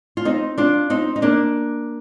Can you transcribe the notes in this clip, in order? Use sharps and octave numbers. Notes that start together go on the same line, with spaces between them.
F4
C4 D#4
D4 F4
C4 D#4
D#4
A#3 D4